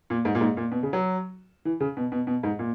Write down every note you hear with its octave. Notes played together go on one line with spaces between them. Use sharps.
A#2
G#2
A#2
G#2
A#2
B2
C#3
F#3
E3
C#3
B2
B2
B2
G#2
A#2